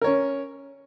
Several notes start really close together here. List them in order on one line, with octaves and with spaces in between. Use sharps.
A#4 C#5 C#4